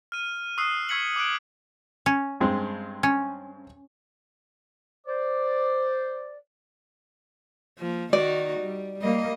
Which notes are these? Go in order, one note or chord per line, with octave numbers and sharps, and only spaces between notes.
F6 D#7
C#6 D#6 E6 F#6 C7
C#6 E6 G#6 B6 C#7 F#7
D6 F#6 D7
C#4
G2 G#3 C4
C#4
C5 D5
F3 A#3
D#3 D#4 F#4 D5
G3
G3 A#3 D#5